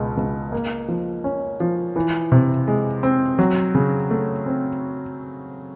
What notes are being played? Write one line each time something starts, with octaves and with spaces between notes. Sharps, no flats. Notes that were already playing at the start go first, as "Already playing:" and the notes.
Already playing: C#2 B2 G#3
C#2
A#3
F3
C#4
F3
E3
C3
G#3
C4
F#3
C#3
A3
C4